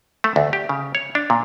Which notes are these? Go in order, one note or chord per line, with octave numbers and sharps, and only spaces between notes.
A3
D2
G4
C#3
C#5
D4
A#2